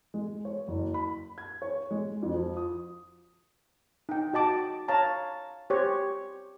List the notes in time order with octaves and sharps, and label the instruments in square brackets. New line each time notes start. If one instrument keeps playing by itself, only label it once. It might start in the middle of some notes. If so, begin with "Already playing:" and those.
[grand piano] G#3
C#5
F#1
B5
G#6
C#5
G#3
F2
F3
D#6
[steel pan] D#4 G5
F#4 D#5 A5 D6
C#5 F5 A5 A#5
G4 C5 C#5